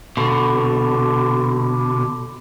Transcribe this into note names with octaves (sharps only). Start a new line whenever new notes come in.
B2 D3